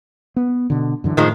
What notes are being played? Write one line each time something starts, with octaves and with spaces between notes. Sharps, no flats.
B3
B2 D3
F#2 D3 E3
A2 D#3 F3 G#3